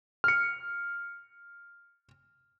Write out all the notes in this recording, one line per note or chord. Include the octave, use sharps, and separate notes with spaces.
F6 C#7